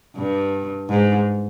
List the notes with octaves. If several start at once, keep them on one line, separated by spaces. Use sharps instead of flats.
G2
G#2